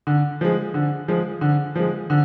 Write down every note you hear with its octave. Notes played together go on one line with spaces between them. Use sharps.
D3
F3 G#3
D3
F3 G#3
D3
F3 G#3
D3